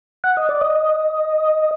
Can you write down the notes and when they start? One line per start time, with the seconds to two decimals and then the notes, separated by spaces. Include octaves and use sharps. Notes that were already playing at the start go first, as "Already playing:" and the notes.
0.24 F#5
0.37 D#5
0.49 D5
0.61 D#5